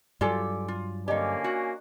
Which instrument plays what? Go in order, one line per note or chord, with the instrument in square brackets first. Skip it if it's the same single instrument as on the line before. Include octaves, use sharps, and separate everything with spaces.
[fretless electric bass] G2 F#3 [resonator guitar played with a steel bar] F4 G4 A4 [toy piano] D5 G#5
[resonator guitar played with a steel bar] F4
[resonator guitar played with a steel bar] D3 G4 [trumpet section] A#3 C#4 G#5 [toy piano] D5 D#5 G5
[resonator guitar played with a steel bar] F#4